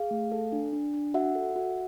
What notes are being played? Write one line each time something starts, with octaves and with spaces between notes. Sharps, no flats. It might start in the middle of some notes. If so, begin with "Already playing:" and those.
Already playing: G#4 F5
A3
A4
D4
D4
D4
F#4 E5 F#5
A4
F#4